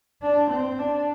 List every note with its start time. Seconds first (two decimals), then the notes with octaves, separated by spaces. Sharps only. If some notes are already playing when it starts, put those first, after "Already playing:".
0.22 D4
0.51 C4
0.79 D4